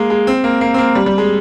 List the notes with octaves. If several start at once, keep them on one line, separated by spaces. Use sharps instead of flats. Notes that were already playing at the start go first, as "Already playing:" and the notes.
Already playing: G#3 A#3
G#3
C4
A#3
A#3
C4
A#3
G3
G3
G#3